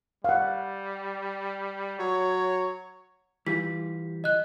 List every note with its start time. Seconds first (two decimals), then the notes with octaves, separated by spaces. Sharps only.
0.24 G3 F5 F#5
1.99 F#3 C#5
3.47 E3 G3 F4 B6
4.24 D#5 F#6